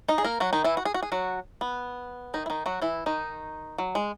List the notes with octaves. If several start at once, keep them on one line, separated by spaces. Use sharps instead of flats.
D#4 D#5
G#4
A#3 A#4
F#3 F#4
D#3 D#4
E3 E4
F#4
G#4
F#4
G#4
F#3 F#4
B3
D#3 D#4
E4
D#3 D#4
F#3 F#4
E3 E4
D#3 D#4
F#3
G#3